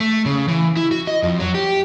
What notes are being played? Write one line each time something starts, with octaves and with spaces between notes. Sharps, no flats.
A3
C#3
E3
E4
F#4
D#5
F2
F#3
G4